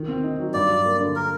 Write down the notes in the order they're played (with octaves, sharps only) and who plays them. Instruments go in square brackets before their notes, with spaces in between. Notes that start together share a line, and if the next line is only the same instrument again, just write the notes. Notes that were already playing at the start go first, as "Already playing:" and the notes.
Already playing: [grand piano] D#3
C4
D#4
F#3
[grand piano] G2 [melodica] D5
[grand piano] F#3
A#3
D3
[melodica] A#4